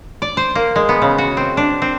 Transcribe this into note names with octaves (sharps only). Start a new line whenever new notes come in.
D5
C5
A#3
G#3
B3
C#3
F#4
C4
D4
C4